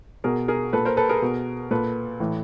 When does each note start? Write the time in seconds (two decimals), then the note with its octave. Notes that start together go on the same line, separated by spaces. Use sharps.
0.24 B2 G#4 A#4
0.48 G#4 A#4
0.73 A#2 A4 B4
0.85 A#4 C5
0.97 A4 B4
1.09 G#4 A#4
1.22 B2
1.71 A#2 A4 B4
2.20 A2 E3